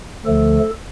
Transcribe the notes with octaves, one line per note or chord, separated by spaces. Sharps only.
D2 D3 F3 A3 A4